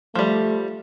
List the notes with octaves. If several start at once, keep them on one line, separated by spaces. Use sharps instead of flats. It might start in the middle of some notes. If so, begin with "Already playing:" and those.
F3 G3 A3